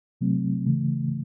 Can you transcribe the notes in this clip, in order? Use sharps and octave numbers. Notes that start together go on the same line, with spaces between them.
C3 F#3 A3 C4
C#3 E3 A3